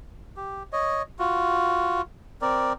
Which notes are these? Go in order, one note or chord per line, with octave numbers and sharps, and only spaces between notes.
G4
C#5 D#5
F4 F#4
C4 A#4 D5